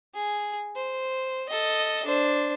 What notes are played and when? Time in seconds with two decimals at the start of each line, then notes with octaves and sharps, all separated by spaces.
0.14 G#4
0.76 C5
1.49 A4 D#5
2.05 D4 C5